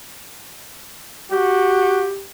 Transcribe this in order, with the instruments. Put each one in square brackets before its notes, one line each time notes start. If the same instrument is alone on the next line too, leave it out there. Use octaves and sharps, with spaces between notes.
[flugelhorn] F#4 [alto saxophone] G4